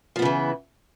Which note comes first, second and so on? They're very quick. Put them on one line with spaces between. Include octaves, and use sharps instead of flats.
F3 B3 C#3 E3